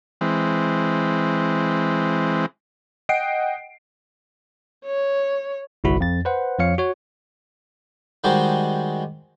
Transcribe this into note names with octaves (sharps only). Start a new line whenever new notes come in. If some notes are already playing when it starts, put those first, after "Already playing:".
E3 G#3 C4
D#5 F#5 G5 C7 D7
C#5
G1 C2 E4 F#4 B5
F2 A6
B4 C5 F#5
F2 F3 C#5 F5 C#7
F#4 C#5
D#3 G3 G#3 F#4 G4 C5